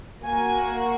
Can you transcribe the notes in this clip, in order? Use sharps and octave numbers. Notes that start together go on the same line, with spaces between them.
A#3 F#4 G#5